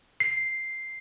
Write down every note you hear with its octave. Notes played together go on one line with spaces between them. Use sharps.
C7